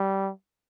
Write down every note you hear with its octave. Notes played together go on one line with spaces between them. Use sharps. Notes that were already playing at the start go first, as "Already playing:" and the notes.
Already playing: G3